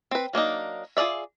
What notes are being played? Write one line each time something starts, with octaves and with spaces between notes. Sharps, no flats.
C4 B4
F#3 A#3 D4 D#4
F4 G#4 A#4 D5 E5